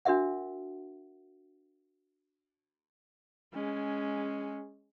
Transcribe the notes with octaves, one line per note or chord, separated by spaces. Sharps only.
D4 F#4 A#4 E5 F#5
G#3 C#4